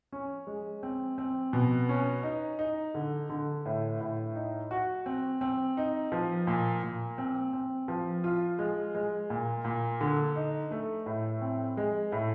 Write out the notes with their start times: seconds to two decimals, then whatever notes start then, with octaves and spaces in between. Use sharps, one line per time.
0.12 C#4
0.47 G#3
0.83 C4
1.18 C4
1.53 B2
1.89 C#4
2.23 D#4
2.59 D#4
2.94 D3
3.29 D3
3.66 A2
4.01 A2
4.36 D#4
4.71 F#4
5.06 C4
5.41 C4
5.77 D#4
6.12 F3
6.47 A#2
6.83 A#2
7.18 C4
7.53 C4
7.88 F3
8.24 F4
8.59 G#3
8.95 G#3
9.30 A#2
9.64 A#2
10.01 D3
10.36 D#4
10.71 A3
11.06 A2
11.41 C4
11.77 G#3
12.12 A2